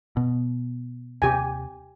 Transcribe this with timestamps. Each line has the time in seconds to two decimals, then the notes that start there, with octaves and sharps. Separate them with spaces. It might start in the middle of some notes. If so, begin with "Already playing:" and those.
0.17 B2
1.22 D#2 C3 C4 G4 G#5